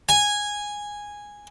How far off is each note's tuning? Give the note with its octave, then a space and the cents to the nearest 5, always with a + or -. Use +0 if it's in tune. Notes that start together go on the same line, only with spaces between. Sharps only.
G#5 -10